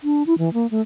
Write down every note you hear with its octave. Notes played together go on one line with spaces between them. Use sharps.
D4
E4
E3
A#3
A3